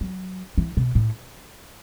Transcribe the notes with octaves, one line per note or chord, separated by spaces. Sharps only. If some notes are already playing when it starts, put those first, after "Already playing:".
F#3
E3
B2
A2